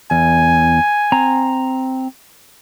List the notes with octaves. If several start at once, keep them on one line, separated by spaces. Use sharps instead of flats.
E2 G#5
C4 A#5